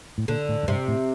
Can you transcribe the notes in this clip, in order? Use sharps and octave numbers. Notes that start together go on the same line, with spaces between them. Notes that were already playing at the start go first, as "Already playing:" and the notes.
A2
A#2 D3
A2
F#2
G2 C3
A2